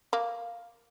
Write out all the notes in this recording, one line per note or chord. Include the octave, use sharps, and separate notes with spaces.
A#3